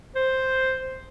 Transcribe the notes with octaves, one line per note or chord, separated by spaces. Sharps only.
C5